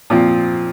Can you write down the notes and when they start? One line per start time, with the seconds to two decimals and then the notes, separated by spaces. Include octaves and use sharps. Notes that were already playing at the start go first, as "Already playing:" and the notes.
0.10 A#2 F3 C4